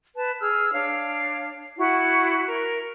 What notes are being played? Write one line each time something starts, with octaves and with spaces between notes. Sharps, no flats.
B4 A5
G#4 E6 F6
D4 C#5 F5
E4 F#4 F#5
A#4